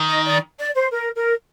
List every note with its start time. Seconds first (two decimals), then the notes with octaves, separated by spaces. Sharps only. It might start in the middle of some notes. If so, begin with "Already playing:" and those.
Already playing: D#3
0.09 D#5
0.25 D5
0.58 D5
0.75 C5
0.92 A#4
1.16 A#4